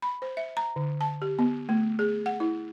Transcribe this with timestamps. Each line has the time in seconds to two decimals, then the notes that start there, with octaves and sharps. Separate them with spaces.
0.02 B5
0.22 C5
0.37 E5
0.57 A#5
0.76 D3
1.01 A5
1.22 G4
1.39 B3
1.69 A3
1.99 G#4
2.26 F#5
2.40 E4